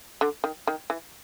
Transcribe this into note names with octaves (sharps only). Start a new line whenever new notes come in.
D3
D#3
D#3
E3